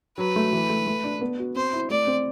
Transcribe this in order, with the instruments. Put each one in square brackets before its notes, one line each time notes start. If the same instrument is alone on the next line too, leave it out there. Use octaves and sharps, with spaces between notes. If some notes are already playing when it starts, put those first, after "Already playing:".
[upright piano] F#3 [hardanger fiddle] B4
[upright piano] A3
E3
A3
A3
D4
B3
F#4
[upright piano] C4 [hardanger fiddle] C5
[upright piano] E4
[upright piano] A3 [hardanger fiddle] D5
[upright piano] C4